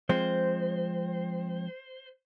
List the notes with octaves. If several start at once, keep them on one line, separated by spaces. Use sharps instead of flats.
F3 G#3 C4 C5